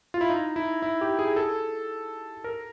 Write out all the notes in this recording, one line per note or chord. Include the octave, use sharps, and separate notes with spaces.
F4
E4
D#4
E4
E4
G4
G#4
A4
A#4